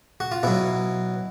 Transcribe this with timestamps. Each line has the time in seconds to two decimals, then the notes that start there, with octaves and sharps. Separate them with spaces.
0.20 F#4
0.32 F4
0.43 B2 F#3 E4